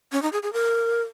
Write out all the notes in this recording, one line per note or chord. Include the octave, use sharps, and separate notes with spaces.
C#4
D#4
G#4
G#4
A#4